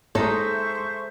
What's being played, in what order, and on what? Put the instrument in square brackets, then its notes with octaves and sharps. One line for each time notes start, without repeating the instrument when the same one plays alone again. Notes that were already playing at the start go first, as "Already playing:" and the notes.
[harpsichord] A2 [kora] G#3 D#4 [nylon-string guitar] A4 [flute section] C5 E5 C#6